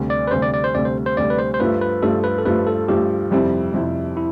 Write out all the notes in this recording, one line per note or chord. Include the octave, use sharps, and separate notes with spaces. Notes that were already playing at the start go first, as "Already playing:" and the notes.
Already playing: D2 C3 G3
D5
B4
D2 C3 G3 C5
D5
D5
C5
D2 C3 G3 D5
C5
C5
D2 C3 G3 D5
B4
C5
C5
G2 F3 A3 B4
B4
G2 F3 A3 A4
B4
A4
G2 F3 A3 B4
A4
G2 F3 A3 G4
F2 C3 G3 C4 E4
F2 C3 G3 C4 E4
E4